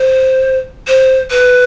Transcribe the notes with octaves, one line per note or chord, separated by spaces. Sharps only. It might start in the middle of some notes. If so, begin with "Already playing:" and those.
Already playing: C5
C5
B4